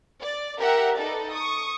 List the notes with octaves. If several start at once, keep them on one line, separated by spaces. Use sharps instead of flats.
D5
G4 A#4 E5 F#5
D#4 A4 B4 D5
C#6 D#6